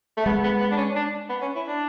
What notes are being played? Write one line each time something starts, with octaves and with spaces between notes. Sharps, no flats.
A3
G#3 B3
B3
B3
D4
C#4
D4
B3
C#4
E4
D4